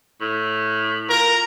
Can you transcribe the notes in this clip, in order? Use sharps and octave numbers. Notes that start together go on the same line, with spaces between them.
A2
F4 A#4